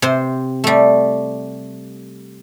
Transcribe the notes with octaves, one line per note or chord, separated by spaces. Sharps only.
C3 C5
G3 A3